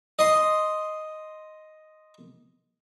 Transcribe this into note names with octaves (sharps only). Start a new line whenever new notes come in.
D#5 C6